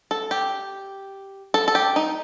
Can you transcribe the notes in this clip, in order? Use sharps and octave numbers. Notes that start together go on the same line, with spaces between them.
A4
G4
A4
A4
G4
D#4